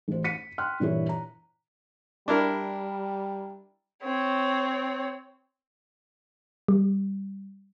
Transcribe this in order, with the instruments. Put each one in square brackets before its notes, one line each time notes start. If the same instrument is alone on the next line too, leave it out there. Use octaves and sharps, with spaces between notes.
[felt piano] A1 C5
B6 C#7 D#7
G5 C6 F6 F#6
G2 A#2 E3 E4 C#5
A#5
[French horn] G3 [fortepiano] D4 E4 A#4
[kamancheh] C4 C#5
[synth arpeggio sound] G3